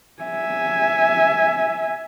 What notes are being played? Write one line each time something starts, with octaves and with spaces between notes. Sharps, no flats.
E5 G#5